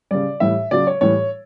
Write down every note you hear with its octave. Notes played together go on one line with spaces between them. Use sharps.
C#3 G3 D5
A2 E3 G3 E5
C#3 F#3 D5
C#5
A2 E3 G3 C#5